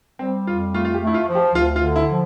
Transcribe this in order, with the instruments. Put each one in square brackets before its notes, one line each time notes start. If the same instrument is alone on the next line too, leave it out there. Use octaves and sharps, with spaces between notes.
[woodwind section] G3 [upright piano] C4
[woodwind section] F2 [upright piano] F4
[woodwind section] A3 [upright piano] F4
[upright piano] F4
G4
[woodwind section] A3
[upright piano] E4
F4
[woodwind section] F3
[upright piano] G4
[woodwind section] D2 [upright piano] F4
[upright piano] F4
[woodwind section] D3
[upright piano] E4
[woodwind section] F3